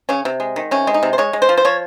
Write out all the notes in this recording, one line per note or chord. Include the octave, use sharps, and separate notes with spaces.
C#3 C#4
C3
G#3
D#3
C3 C#4
G#3
D#4
C3
C5
G#3 C#5
G#3
C5
F3
C5
F3 C#5